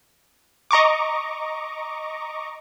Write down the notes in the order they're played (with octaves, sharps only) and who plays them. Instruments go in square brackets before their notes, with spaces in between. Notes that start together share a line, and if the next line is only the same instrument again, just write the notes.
[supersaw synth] D#5 A#5 C#6 D6